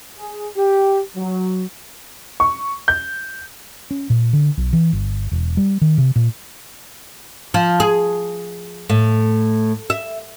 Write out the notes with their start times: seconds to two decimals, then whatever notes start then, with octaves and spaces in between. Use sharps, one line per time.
0.18 G#4
0.56 G4
1.16 F#3
2.40 C#6
2.88 G6
3.91 C#4
4.10 A#2
4.33 D3
4.57 B1
4.73 E3
4.93 G1
5.31 E1
5.57 G3
5.81 D#3
5.98 C3
6.16 A#2
7.54 F3
7.80 G#4
8.89 A2
9.90 E5